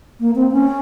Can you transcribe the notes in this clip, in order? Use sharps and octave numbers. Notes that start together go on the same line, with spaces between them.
A#3
C4
C#4